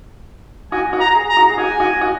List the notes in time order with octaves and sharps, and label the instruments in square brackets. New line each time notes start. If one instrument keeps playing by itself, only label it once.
[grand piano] F#4 [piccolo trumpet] G#5
[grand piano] F#4
[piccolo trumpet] A#5
[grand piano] G#4
[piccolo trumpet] A#5
[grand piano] F#4
G#4
[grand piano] F#4 [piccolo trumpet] G#5
[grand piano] F#4
F#4